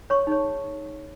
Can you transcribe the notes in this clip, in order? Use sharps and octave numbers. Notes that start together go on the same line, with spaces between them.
C#5 C#6
D#4 G#4 C#5